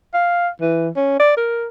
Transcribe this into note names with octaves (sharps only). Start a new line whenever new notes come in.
F5
E3
C#4
D5
A#4